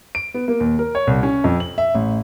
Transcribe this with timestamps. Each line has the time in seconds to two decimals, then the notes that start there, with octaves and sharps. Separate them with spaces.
0.15 D7
0.34 B3
0.48 A#3
0.60 D#2
0.79 A#4
0.95 C#5
1.07 C2
1.23 C#4
1.44 F2
1.60 F#7
1.78 E5
1.95 A1